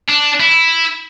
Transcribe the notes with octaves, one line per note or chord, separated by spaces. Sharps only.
D4
E4